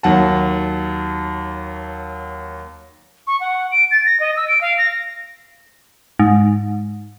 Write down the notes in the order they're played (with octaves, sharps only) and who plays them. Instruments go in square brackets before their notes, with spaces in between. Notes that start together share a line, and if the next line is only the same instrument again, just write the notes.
[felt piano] D#2 F#3 F#5 A5
[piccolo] C#6
F#5
D7
A6
A#6
D#5
E6
D7
F5
A#6
[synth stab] G#2